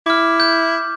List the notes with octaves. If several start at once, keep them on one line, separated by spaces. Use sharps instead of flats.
E4 D6 F6
G6